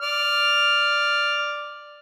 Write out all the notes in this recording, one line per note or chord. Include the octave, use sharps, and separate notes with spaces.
D5 F6